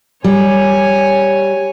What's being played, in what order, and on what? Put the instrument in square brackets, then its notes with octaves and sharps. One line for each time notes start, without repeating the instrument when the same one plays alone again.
[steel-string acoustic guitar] G3 [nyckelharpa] C#5 G#5